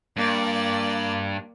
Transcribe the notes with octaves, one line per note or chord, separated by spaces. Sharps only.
G2 A#3 D5